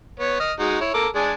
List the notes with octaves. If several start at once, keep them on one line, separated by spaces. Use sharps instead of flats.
B3 C#5
D#5 F6
G#3 D#4 F#4
E4 C#5
A4 A#4 D6
G#3 D4 G#4